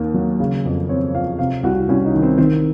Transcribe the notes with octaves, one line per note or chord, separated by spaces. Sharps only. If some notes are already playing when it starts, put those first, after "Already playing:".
Already playing: D#2 D#3 A#3
F#3
C#3
F2
C4 C#5
F3 F5
C3 F5
C2 F#4
C2 C#4
D#4
D#3
C4
D#3 C4